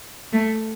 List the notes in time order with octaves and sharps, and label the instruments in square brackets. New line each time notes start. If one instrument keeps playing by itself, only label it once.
[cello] A3